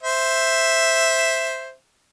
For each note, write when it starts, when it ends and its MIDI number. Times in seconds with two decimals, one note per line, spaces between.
0.03 1.73 72
0.03 1.73 76